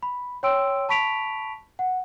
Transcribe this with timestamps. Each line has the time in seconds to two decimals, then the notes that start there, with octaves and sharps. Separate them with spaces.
0.03 B5
0.43 C#5 G5 C6 E6 D7
0.89 A5 B5 C#6 B6 D7 F7
1.79 F#5